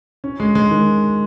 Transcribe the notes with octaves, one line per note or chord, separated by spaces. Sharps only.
C#4
G#3
G#3
D#3